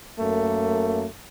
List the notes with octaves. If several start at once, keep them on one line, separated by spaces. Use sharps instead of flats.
F#2 A3 A#3